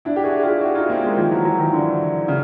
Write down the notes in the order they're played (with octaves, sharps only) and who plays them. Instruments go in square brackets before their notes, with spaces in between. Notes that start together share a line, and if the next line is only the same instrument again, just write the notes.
[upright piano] D4 E4
G4
F#4 G#4
F4 G4
E4 F#4
D#4 F4
A#3 C4
G#3 A#3
D#3 F3
E3 F#3
E3 F#3
D#3 F3
D3 E3
C#3